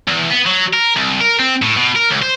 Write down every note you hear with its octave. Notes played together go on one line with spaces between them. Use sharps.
E2
B3
F#3
A#4
C2
A#4
C4
A2
B2
A#4
C#2
C5